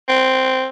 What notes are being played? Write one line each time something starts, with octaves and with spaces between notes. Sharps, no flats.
C4